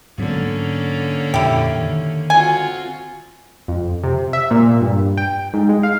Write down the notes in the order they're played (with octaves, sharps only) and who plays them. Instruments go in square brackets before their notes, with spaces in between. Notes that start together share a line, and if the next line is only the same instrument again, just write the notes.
[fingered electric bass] G#2 F#3 B3 [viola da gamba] D3 A#3 C#4
[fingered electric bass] F2 A#2 [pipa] E4 G4
[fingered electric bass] D#3
[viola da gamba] C4 F4 F#4 [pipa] G#5
[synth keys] F2
C3
E5
A#2
G2
G5
G#2
G#3
F5